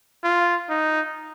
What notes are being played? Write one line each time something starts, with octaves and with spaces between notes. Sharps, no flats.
F4
D#4